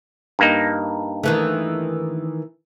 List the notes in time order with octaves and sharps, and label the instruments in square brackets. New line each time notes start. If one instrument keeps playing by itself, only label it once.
[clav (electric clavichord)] G2 A#3 D#4
[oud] D#3 E3 A3